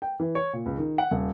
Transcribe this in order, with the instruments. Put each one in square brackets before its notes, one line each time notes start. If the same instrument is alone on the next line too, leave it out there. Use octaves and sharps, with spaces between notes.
[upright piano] G5
E3
C#5
A#2
C#2
D#3
F#5
D#1